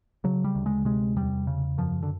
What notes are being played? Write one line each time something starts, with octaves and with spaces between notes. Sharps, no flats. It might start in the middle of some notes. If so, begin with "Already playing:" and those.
C#3 F#3
G3
D2
G#3
C3 G#3
E2 G3
C#3
F#2 F3
D3